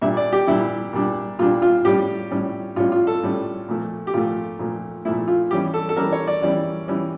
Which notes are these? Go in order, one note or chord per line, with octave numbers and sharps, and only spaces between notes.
A#2 G3 D4 E5
D5
G4
A#2 G3 D4 E4
A#2 G3 D4
A#2 G3 D4 F4
F4
A2 G3 C#4 G4
A2 G3 C#4
A2 G3 C#4 F4
F4
A4
A2 G3 C#4
A#2 F3 A3
G4
A#2 F3 A3 F4
A#2 F3 A3
A#2 F3 A3 E4
F4
E3 G3 C#4 G4
A4
A4
E3 G3 C#4 A#4
C#5
D5
E3 G3 C#4 D5
E3 G3 C#4